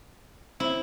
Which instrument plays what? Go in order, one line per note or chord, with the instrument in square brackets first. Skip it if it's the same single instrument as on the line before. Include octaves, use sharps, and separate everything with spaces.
[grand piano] C4 [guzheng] E4